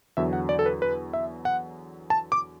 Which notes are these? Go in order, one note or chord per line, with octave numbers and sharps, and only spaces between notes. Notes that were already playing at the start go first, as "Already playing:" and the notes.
E2 D3 F#3 E5
F#5
D5
A4
B4
B4
E5
F#5
A5
D6